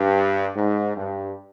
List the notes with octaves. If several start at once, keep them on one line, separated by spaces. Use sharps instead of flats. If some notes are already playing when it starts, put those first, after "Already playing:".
Already playing: G2
G#2
G2